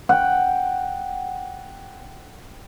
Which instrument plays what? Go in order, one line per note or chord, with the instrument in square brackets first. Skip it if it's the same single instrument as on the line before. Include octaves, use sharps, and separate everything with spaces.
[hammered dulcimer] F#5 G5